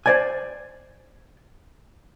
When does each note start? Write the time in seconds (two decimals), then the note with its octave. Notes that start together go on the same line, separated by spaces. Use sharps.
0.06 C5 D5 G#5